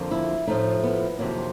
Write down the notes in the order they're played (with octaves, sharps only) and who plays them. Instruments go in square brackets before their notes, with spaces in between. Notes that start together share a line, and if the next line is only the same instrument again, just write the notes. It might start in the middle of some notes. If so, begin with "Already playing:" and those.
Already playing: [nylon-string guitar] F2 D3 F3 A#3
E4
A2 F3 A3 D#4
B3
F2 C3 D#3 F#3 A#3